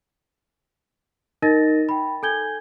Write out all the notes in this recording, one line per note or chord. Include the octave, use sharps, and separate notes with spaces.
D#4 A#4 D#5 A6 A#6
G5 B5
A4 G#5 G6 G#6 G7